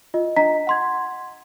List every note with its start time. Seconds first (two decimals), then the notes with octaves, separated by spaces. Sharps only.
0.14 F4 D#5
0.36 D4 D#5 A#5 B6
0.67 F#5 C6 G#6